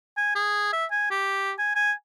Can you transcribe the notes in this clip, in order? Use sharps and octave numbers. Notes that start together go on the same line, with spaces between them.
G#5
G#4
E5
G#5
G4
G#5
G#5